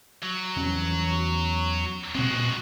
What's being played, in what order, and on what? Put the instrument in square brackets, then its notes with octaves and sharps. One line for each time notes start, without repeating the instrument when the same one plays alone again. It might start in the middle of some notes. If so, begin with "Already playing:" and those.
[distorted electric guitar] F#3
[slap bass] E2 E3 C#4
[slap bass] A#2 C4 [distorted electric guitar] G#3 F#4